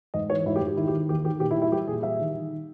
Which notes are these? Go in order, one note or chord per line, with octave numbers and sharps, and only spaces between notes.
G#2 D#5
E3 C#5
G#2 E4
G4
G#2
G4
D#3 E4
G4
D#3
D#2 G4
D#3 G4
A#2 G4
E4
G3
E4
G3 G4
A#2 G#4
G3 E5
D#3
D#3